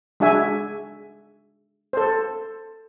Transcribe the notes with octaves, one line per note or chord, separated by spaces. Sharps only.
G#3 D4 F#4 E5 G#5
A4 C5